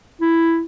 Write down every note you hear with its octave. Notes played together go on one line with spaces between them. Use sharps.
E4